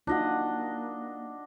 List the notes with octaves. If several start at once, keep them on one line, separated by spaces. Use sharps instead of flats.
A#3 D4 D#4 F4 F#4 D#5 F#5